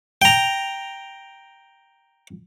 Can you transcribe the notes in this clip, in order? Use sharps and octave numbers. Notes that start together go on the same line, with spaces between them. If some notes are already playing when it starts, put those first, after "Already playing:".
G5 A#5